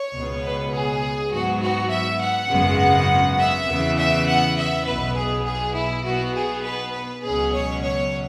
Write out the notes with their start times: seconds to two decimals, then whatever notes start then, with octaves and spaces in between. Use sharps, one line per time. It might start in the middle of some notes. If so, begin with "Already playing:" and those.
Already playing: C#5
0.13 C#2 B2 B3
0.43 B4
0.73 G#4
1.31 G#2 F#3 B3 F#4
1.61 F#4
1.90 E5
2.21 F#5
2.50 G#1 F#2 C#3 G#3 B3
3.39 E5
3.69 E2 C#3 E3 B3
3.98 E5
4.27 F#5
4.57 E5
4.86 B1 B2 B3 B4
5.17 G#4
5.46 G#4
5.75 E4
6.05 B1 B2 B3 F#4
6.34 G#4
6.64 B4
6.93 B4
7.23 C#2 B2 F#3 C#4 G#4
7.54 C#5
7.83 C#5